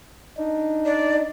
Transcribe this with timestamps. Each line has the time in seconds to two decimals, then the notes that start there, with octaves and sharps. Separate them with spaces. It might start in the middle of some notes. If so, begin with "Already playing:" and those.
0.37 D4 D#4
0.85 D5